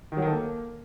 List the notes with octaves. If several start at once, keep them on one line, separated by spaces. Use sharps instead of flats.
D#3
F#3
D#3
A4
A#3